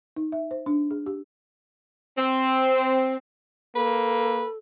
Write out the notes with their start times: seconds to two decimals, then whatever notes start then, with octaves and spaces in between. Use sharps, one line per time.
0.16 D#4
0.32 E5
0.51 C5
0.66 D4
0.91 G#4
1.06 G4
2.18 C4
3.75 A#3 A4 B4